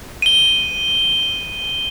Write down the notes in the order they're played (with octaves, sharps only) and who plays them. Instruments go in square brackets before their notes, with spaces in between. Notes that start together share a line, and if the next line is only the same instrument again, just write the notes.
[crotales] D#7 G7